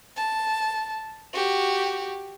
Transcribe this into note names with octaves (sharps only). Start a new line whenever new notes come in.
A5
F#4 G4